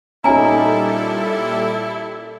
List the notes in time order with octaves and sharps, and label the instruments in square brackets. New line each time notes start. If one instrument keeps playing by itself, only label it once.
[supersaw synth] A#2 G3 A4 [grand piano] C#4 D#4 [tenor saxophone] E4 [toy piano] G#5 A#5